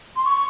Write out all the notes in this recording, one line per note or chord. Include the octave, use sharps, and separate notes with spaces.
C6
C#6